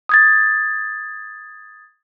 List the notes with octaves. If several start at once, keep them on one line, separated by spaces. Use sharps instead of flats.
D#6 G#6 A6